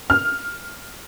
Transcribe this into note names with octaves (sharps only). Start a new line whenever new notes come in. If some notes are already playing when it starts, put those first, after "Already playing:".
F6